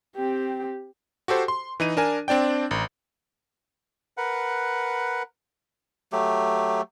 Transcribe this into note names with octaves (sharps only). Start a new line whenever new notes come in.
C4 G4
F#4 G4 A4 C5
C6
E3 D#4 D#7
D4 A#4 G#5
C4 D4 D5 G5
A1
A#4 B4 F#5
F#3 A3 G4